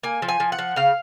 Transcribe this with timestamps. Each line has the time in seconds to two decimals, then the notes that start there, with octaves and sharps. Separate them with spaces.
0.03 A#3 G#5
0.22 F3
0.29 G#5
0.40 F3
0.52 F#5
0.59 F3
0.76 C#3 F5